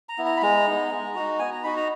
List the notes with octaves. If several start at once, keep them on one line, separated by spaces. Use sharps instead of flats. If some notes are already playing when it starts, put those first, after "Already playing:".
A#5
B3 E4
A#5
B5
G#3 A#5
B3 D#4
G#3
D#4 F#4
B3 G#5
A#5
D#4 F#4 B5
A#5